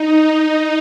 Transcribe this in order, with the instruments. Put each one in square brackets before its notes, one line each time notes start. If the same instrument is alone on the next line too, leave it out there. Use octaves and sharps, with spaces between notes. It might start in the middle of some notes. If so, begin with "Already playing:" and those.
Already playing: [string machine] D#4